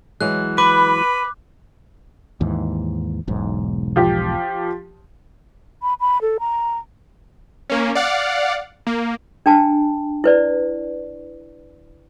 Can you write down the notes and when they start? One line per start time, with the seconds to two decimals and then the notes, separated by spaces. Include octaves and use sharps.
0.21 E3 F#3 G#3 F#6
0.58 B4 B5 D6
2.41 D#2 G#2 E3
3.28 E1 B1 G#2
3.96 F3 G4
5.81 B5
6.00 B5
6.21 A4
6.40 A#5
7.70 A#3 C#4
7.95 D5 F5 F#5
8.87 A#3
9.46 D4 G5 A5
10.24 E4 B4 D5